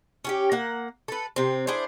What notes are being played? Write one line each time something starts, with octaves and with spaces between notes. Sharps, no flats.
C#4 F#4 G4
A#3 F#5
A4 B4
C3 C4
D4 E4 G#4 C5